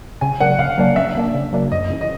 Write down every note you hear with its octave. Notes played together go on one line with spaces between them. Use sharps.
C#3 G#5
F#3 A#3 D4 F#5
C#3 F5
F#3 A#3 D4
C#3 E5
F#3 A#3 D4
C#3
F#3 A#3 D4
F#2 D#5
C#3 E3
D#5